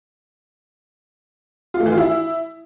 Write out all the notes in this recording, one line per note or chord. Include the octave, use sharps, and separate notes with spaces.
F4
A3
E3
F4
E4